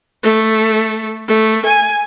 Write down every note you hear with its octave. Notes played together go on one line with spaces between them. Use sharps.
A3
A3
G#5